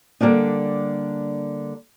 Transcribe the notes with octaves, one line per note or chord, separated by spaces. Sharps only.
D3 G3 A#3 D4 D#4